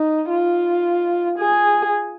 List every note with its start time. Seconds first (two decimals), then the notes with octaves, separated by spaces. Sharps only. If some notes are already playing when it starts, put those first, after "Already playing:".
Already playing: D#4
0.30 F4
1.38 G#4